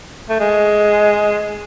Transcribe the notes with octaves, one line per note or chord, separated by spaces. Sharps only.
A3
G#3